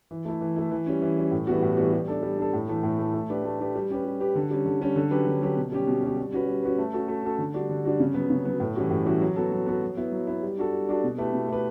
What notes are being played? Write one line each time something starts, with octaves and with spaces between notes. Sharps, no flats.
E3
A3 E4
E3
A3 E4
E3
G3 C#4
E3
G3 C#4
A2
E3 G3 B3 F#4
A2
E3 G3 B3 F#4
G3
D4 A4
G3
D4 A4
A2
E3 A3
A2
E3 A3
A3
D4 G4 B4
A3
D4 G4 B4
G3
C#4 G4 B4
G3
C#4 G4 B4
D3
G3 C#4
D3
G3 C#4
D3
F#3 C#4 G4 B4
D3
F#3 C#4 G4 B4
B2
G3 C#4 G4
B2
G3 C#4 G4
G3
C#4 F#4 B4
G3
C#4 F#4 B4
A3
C#4 F#4 A4
A3
C#4 F#4 A4
D3
G3 D4 F#4
D3
G3 D4 F#4
C#3
F#3 B3
C#3
F#3 B3
A2
E3 G3 C#4 F#4
A2
E3 G3 C#4 F#4
F#3
B3 F#4 A4
F#3
B3 F#4 A4
F#3
B3 E4
F#3
B3 E4
G3
D4 F#4 A4
G3
D4 F#4 A4
B2
A3 E4 G4 B4
B2
A3 E4 G4 B4